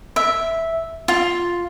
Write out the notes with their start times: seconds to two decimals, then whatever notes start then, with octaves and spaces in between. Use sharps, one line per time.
0.16 E5
1.08 F4